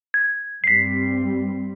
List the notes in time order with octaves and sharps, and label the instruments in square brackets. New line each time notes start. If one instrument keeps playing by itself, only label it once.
[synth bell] G#6
[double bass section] G2 G3 C4 [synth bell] B6 C7